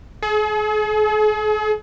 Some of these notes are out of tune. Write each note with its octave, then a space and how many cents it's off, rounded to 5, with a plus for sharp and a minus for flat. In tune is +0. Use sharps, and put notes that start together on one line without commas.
G#4 +40